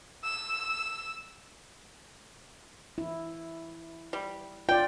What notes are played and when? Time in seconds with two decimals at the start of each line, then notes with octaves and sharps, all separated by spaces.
0.25 E6
2.98 E4
4.13 G3
4.69 F4 D5 G5